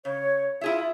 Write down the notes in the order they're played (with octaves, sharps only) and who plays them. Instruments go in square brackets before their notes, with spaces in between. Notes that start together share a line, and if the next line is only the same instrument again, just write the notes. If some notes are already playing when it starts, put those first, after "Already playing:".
[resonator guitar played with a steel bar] C#3 [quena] C#5
[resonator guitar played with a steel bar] E4 G#4 E5 [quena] F4